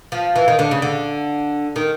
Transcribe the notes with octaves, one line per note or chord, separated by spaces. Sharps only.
F3
E3
D#3
D3
C#3
D3
D#3